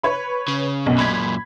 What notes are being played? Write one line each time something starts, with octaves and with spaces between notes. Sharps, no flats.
B4 C#5 B5
C#3
B1 F#2 B2
F#2 A#2 B5 G#6 B6